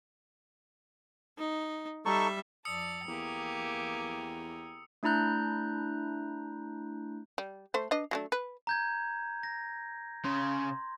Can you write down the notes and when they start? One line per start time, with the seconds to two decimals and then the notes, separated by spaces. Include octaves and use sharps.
1.38 D#4
2.05 G3 D#4 A4 E5 C#6
2.65 F2 D5 A5 D#6 E6 C#7
3.08 E2 A#3 G4 G5 G#5 A#5
5.03 A3 D4 E4 A#5 F#6 G6
7.38 G3
7.74 A3 C5
7.91 D4 B4 D#5
8.11 F#3 A3 D4
8.32 B4
8.67 A#5 G6 G#6
9.43 A#6
10.25 C#3 C6